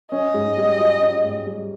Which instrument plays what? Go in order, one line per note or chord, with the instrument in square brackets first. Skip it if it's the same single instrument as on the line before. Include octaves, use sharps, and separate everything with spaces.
[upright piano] C#4 [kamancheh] D#5
[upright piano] G#2
G3
F4
C#4
G#2
G3